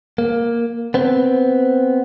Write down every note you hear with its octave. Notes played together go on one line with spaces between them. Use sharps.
A#3
B3 C4